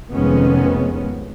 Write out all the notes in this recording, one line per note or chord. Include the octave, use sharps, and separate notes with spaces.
F1 F2 D#3 G#3 B3 C#4